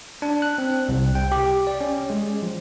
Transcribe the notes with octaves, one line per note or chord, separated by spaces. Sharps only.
D4
F#6
C4
C2
G5
G4
D5
C#4
G#3
F3